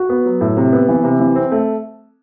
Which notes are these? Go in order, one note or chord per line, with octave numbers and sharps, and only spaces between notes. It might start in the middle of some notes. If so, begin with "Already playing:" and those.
Already playing: F#4
B3
F#3
A2
C3
B3
E3
C3
E3
C4
A3